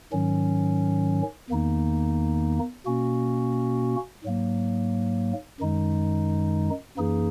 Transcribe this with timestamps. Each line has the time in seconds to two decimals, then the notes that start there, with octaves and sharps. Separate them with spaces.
0.12 G#2 D#3 F#3 C#4
1.50 E2 D#3 A#3 D#4
2.86 B2 A#3 C#4 F#4
4.24 G#2 F#3 A#3
5.60 F#2 D#3 G#3 D#4
6.97 F#2 E3 A#3 D#4 G#4